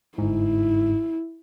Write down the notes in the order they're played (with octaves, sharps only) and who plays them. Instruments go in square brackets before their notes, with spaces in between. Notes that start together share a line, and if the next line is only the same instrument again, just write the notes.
[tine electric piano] G1 G#2 [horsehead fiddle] E4